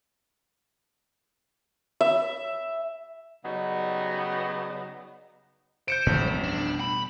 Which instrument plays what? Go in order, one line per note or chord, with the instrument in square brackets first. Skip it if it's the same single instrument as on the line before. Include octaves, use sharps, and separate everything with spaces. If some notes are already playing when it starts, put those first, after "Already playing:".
[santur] E5
[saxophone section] C#3 F#3 G3 B3 C#4 D#4
[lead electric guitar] C5 [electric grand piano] G6 C#7 D7
[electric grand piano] A1 F2 [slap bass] A2 D3 E3
[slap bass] B2 G3 A3
[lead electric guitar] D4
B5